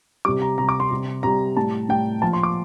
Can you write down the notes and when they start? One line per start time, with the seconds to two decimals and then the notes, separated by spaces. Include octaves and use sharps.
0.25 C3 G3 D6
0.42 A#5
0.58 C3 G3 A#5
0.69 D6
0.80 C6
0.91 C3 G3
1.23 C3 G3 A#5
1.57 A2 G3 A5
1.89 A2 G3 G5
2.22 A#2 F3 A5
2.33 C6
2.43 D6